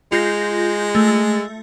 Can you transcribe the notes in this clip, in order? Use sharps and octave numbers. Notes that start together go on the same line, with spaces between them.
G#3 F4 G6 A#6
A3